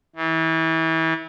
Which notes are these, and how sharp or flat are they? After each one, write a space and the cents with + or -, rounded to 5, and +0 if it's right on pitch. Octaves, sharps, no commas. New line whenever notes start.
E3 -30